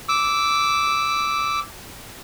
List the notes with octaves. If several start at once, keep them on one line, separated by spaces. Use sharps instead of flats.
D6 E6